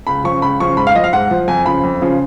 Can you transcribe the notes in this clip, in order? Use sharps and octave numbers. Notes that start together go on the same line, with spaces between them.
C#2 B5
C#3 F3 C#6
C#2 B5
C#3 F3 C#6
G#2 B5
F5
F3 D#5
F5
G#2 F#5
F3
F2 G#5
C#3 F3 B5
F2
C#3 F3